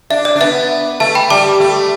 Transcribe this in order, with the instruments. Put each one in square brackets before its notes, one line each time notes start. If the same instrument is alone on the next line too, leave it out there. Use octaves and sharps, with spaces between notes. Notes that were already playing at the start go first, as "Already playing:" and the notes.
[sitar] D4 [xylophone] E5
[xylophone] D5
[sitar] D4
[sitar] B3 [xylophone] E5
[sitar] A3 [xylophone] E5 A5
[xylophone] G5 B5
[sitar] G3 [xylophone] A5 D6
[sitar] A3